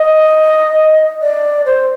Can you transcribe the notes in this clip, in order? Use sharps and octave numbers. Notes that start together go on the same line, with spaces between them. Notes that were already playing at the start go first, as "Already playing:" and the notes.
Already playing: D#5
D5
C5